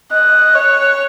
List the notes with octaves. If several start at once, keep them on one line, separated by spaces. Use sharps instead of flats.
D#5 F#6
C#5